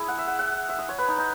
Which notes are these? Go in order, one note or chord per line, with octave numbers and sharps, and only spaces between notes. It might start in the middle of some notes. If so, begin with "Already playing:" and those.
Already playing: E4 G#4
F#5
E5
F#5
F#5
E5
D#5
C#5
B4
D#4
D#4